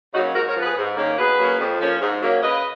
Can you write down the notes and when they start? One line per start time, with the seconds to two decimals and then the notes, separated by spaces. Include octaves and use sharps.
0.14 C#3 F#3 A#3 C#4 D#4 F#4
0.34 G#2 F#4 A#4
0.48 A#4 C#5
0.56 F3 B3
0.62 G#4 B4
0.77 G#2
0.97 D#3 A#3 C#4
1.18 B2 G#4 B4
1.38 F#3 A#3 C#4
1.59 F2
1.80 F3 A#3 C#4
2.01 G#2
2.21 F#3 A#3 C#4
2.42 C#3 B4 D#5